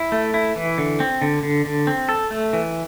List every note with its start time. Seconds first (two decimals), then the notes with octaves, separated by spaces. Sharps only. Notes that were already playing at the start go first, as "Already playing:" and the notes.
Already playing: E4
0.12 A3
0.34 E4
0.56 E3
0.78 D3
1.00 C4
1.22 D3
1.43 D3
1.65 D3
1.87 C4
2.09 A4
2.31 A3
2.53 E3